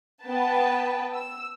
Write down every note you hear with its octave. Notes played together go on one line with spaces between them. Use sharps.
B3 B4 G5 A5
E6